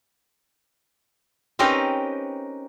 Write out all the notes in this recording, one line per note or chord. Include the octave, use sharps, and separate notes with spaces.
C4 C#4 D#4 G4 A#4 B4